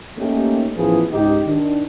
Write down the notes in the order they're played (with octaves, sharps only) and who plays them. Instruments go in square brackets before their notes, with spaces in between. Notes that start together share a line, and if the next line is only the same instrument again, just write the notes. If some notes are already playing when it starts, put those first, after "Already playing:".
[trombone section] A3 A#3 C#4 D#4 G4
A1 E3 F3 B3 E4 G#4
C#2 G#2 D#4 G4
D#3 D4